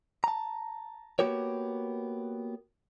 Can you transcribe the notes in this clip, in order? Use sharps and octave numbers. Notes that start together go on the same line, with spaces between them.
A5 A#5
A#3 B3 F#4 G4 A#4 C#5